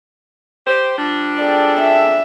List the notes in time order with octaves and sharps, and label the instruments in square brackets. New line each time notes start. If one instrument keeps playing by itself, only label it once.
[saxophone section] G4 C5
F3 G3 D4
[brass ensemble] G#4 A4 G5 [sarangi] D5
[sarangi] E5